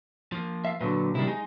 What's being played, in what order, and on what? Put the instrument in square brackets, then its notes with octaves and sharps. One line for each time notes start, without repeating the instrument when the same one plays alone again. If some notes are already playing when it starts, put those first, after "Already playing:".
[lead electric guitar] F3 A#3
[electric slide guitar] E5 F5
[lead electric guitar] A#2 [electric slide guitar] D3 F#3 B4
[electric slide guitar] C3 D#3 G3 [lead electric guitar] D4 E4
[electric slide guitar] G#3 [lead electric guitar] D#4